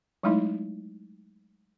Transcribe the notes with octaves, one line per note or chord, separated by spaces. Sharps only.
F#3 G#3 A3 D#4 E4